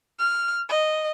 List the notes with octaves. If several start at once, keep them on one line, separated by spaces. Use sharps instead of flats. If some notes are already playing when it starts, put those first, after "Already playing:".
F6
D#5